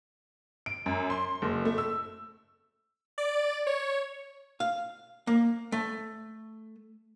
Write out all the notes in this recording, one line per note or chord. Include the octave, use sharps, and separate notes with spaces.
D7
F#2
C6
F#1
A3
E6
D5
C#5
F5
A#3
A3